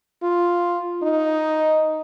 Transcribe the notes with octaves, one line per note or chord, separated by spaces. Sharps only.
F4
D#4